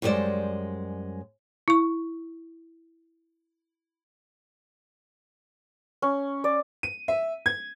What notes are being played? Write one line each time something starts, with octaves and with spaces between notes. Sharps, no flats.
F#2 G3 G#3 F4 C5 D5
E4 C#6
C#4
D5
D#7
E5
G#6